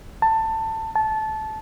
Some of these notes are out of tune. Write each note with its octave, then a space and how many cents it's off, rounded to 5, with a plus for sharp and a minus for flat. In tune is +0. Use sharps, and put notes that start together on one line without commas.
A5 +20
A5 -15